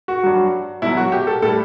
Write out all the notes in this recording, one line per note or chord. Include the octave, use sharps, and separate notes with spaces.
F#4
G2 F#3
B2 F#3 E4
F#4
G4
A4
A2 G3 A4